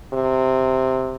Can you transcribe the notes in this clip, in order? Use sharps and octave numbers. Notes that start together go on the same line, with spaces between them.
C3